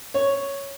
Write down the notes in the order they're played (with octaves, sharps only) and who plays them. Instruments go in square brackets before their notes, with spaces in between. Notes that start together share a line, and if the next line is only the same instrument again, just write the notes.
[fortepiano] C#5